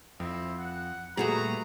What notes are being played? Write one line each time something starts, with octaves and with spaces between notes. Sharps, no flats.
F2 C4 E4
F#5
A#2 G3 A3 F#4 G#4 B4 A#5